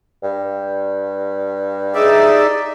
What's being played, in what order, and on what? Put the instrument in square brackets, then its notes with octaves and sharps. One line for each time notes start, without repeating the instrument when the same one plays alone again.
[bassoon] G2
[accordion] D#4 D5 E5 [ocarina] G#4